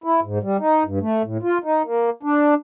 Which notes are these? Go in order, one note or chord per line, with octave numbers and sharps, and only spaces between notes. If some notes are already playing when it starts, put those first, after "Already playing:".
E4
G#2
G3
D#4
G2
A3
A2
F4
D#4
A#3
D4